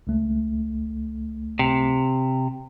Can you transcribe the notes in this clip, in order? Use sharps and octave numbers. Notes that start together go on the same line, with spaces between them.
C#2 A3
C3